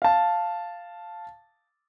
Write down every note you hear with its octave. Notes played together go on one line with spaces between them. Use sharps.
F5 A5